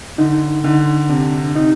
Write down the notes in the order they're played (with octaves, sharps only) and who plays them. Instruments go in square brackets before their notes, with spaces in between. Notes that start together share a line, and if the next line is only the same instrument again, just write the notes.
[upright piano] D3 [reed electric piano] D#4
[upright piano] D3 [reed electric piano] D#4
[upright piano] C3 [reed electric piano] D4
[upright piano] C3 [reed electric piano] D#4